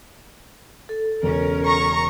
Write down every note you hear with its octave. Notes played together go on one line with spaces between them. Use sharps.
A4
E1 C#3 C#4 A#4
A#5 C#6